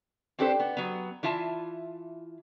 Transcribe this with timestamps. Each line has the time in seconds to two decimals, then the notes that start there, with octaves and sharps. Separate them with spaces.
0.39 C4 D4 G4 A4 B4 C5
0.60 B3
0.77 F#3 B3
1.23 E3 E4 F4 E5 A5